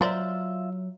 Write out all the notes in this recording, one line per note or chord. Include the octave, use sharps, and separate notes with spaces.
F#3 F4 A#4 C5 D5 E5